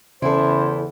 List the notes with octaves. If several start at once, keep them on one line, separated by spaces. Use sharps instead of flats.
E2 C#3 E4 A4 C5